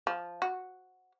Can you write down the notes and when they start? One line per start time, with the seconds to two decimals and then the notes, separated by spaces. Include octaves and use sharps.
0.07 F3
0.42 F#4